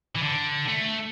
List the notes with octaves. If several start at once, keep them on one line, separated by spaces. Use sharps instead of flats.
E3
D3
A3